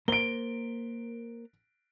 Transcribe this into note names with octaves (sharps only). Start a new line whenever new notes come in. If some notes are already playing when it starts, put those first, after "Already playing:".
A#3 A#4 C5 D7 G7